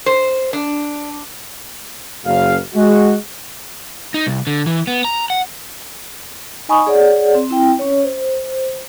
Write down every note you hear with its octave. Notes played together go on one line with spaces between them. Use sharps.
C5
D4
F#1 F#2 F5
G#3 F#4
D#4
C2
D3
E3
B3
A#5
F#5
D#4 D#5 G#5 B5 C#6 D#6
G#4 C#5 D5 F#5
C4
C4 E4 G5
C#4 C#5
C5